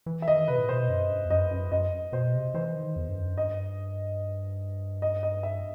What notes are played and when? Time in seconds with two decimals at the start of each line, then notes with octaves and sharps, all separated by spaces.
0.06 E3
0.22 E5
0.27 D#3 D#5
0.48 C3 B4
0.58 A2
0.69 B2 C5
0.89 F#2
1.10 G2
1.25 E2
1.30 F#2 D#5
1.51 F#2
1.72 F#2 D#5
2.13 B2 C5
2.34 C3
2.54 E3 C5
2.75 D#3
2.96 E2
3.08 G2
3.16 F#2
3.37 G2 D#5
5.02 D#5
5.23 D#5
5.43 E5